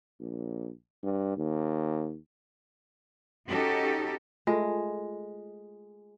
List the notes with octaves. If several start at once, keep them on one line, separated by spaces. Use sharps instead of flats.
A#1
G2
D#2
C#4 D#4 F#4 G4 A4
G#3 A3 F4 G#5